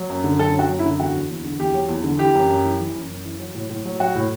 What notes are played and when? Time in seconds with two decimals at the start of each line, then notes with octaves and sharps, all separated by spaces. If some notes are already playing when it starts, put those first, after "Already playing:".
Already playing: F#3
0.10 F#2
0.24 D3
0.39 F#2 A4
0.54 F#3
0.59 F#4
0.69 F#2
0.79 E4
0.84 D3
1.00 E2 F#4
1.14 F#3
1.30 E2
1.44 D3
1.59 E2 G4
1.74 F#3
1.89 E2
2.04 D3
2.19 E3 G4
2.35 F#2
2.49 F#2
2.64 E3
2.80 E3
2.95 F#2
3.09 F#2
3.25 E3
3.39 F#3
3.55 A2
3.69 A2
3.85 F#3
4.00 F#3 F#4
4.15 A2